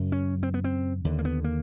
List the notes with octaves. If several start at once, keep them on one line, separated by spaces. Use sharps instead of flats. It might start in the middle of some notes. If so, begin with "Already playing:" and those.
Already playing: F#2 C#3
C#4
C4
B3
C4
D#2 D3
A#3
B3
A#3